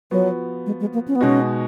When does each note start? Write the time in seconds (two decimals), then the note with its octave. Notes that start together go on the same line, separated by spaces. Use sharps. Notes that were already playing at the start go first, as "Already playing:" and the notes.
0.11 F3 F#3 B3 F#4
0.66 G#3
0.80 G#3
0.94 A#3
1.08 C#4
1.16 B3
1.21 B2 G#3 C#4 D#4 F#4